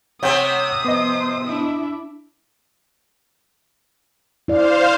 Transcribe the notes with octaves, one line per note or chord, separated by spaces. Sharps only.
C3 C4 C#5 F#5 D#6 G6
F3 B3 C5 D#5
D4 E4
E4 C5 D5 F5